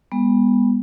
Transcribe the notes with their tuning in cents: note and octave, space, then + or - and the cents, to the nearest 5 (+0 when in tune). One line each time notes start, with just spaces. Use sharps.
G#3 -45 B3 -15